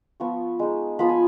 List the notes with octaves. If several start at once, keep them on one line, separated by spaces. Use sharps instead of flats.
F3 B3 F4 C#6
G#3 D#4
F3 B3 F4 B5
G#5